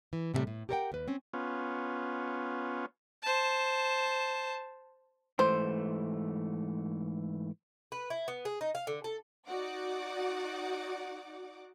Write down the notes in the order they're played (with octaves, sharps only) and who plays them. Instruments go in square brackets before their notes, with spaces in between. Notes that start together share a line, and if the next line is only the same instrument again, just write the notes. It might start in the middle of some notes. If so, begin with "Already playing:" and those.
[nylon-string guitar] E3
A2 C3 E3 G3 A3
A2
G4 A4 A#4 C#5 F#5 G5
D#2 B4
C4 C#4
[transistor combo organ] B3 C#4 F4
[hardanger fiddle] C5 A5
[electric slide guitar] G#2 E3 A3 [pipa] C5
[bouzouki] B4
E4
B3
G#4
D#4
F5
D3
A4
[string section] D#4 F#4 D5 F#5 D6